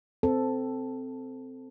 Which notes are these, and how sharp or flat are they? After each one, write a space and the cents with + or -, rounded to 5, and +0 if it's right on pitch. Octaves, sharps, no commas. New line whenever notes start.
C4 -10 A4 +0